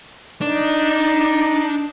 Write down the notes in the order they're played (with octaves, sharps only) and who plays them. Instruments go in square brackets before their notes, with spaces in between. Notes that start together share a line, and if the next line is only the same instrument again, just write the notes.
[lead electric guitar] D4 [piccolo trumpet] D#4